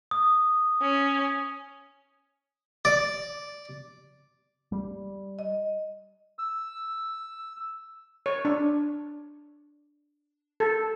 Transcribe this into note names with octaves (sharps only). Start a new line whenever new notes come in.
D#6
C#4
D5
G3
D#5
E6
C#5
D4
A4